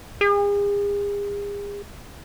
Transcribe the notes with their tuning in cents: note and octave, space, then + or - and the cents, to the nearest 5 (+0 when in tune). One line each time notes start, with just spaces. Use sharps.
G#4 -40